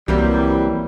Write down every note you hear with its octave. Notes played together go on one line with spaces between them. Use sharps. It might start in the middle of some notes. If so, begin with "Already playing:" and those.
C2 E3 F#3 G3 A#3 C4 E4